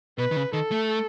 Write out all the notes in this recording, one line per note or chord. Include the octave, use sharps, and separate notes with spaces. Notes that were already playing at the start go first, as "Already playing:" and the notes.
B2 B4
D#3
C#3
D#3 A4
A3